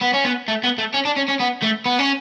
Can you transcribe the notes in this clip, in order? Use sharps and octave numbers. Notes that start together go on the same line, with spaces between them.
B3
C#4
B3
A3
B3
A3
C#4
D4
C#4
C#4
B3
A3
B3
C#4